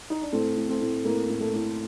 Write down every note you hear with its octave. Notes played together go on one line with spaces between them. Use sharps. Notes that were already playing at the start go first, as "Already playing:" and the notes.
D#4
D4
A2 A3 C4
A2
A3 C4
A2
A2 A#3
A2
A3
A2